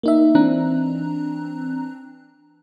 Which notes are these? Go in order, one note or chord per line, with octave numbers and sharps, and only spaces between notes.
A#3 D#4 E5
E3 C4 D4 A#5 F#6